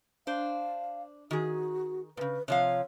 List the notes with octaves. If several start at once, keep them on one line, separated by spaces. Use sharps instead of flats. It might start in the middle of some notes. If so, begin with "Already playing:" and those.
D4 C5 F5
D#3 F#4 G#4
A#2 C#3 B4
C3 F3 C#5 F5